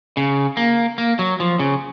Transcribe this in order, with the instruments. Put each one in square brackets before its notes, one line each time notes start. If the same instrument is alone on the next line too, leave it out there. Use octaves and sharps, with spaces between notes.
[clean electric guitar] C#3
A#3
A#3
F#3
F3
C#3